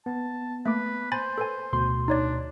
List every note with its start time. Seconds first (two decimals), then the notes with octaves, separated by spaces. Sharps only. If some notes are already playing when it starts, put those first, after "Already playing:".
0.06 B3 A5
0.66 A3 A#3 B4 D6
1.12 C5 G#5 B5 A6
1.38 A4 B4 G#5
1.73 D2 B2 C6
2.08 D4 D#4 C#5 D5